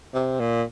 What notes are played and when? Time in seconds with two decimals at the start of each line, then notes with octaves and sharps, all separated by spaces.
0.14 C3
0.40 A#2